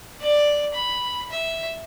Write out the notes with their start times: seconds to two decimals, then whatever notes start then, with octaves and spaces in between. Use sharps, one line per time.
0.21 D5
0.74 B5
1.30 E5